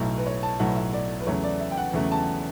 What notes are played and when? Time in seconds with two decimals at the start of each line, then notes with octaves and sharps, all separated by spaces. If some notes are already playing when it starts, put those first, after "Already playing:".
Already playing: B1 A2 F#3 A3
0.18 B4
0.27 C#5
0.43 A5
0.59 B1 A2 F#3 A3 F#5
0.76 E5
0.93 D5
1.21 B4
1.26 E2 C#3 F#3 A3 C#5
1.44 D5
1.60 E5
1.71 G5
1.77 F#5
1.94 E2 C#3 F#3 A3
2.12 A5